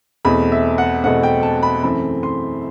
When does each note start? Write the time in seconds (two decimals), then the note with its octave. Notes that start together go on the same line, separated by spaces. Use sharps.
0.25 E2 B2 A3 C4 B5
0.52 E5
0.78 F#5
1.03 E2 B2 A3 C4 F#5
1.23 G5
1.43 A5
1.63 B5
1.83 F#2 E3 A3 C4 B5
2.23 C6